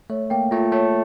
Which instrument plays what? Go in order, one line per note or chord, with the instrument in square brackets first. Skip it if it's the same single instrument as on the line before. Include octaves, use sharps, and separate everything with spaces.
[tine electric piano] A3 [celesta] C#5
[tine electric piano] A#3 [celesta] G5
[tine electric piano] A3 [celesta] F4
[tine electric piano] A3 [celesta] C#5